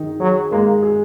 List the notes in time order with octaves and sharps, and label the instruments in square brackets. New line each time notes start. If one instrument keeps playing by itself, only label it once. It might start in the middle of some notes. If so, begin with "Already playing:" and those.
Already playing: [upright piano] D#3 D#4 G#4
[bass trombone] F#3 [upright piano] G#4
[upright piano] G#3 [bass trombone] A#3
[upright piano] G#4